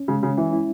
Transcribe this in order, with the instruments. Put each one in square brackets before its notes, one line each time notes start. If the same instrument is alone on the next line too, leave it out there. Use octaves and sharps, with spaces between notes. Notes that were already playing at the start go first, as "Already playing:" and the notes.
Already playing: [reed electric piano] C#4
[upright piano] C#3 [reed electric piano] G#3
[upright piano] C#3 [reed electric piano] C#4
[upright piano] E3 [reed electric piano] E4
[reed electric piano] E4